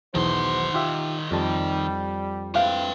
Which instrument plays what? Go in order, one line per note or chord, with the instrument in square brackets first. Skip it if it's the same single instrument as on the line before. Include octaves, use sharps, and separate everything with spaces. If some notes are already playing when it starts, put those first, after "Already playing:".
[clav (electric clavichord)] B1 E2 [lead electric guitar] D#3 C6 [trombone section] E4 F#4 C5
[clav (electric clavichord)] F4 G4 E5
[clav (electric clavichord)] F2 A5 [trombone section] G3
[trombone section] A3 C4 E4 [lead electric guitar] B4 G5 [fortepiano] F5